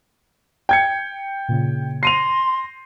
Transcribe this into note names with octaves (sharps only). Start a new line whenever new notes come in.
G5 G#6 C#7
A#2 C#3
C6 A#6 C7 D#7 F7